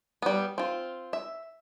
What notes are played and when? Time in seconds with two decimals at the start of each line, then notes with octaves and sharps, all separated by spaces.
0.22 G3 B3
0.58 C4 F4
1.13 E5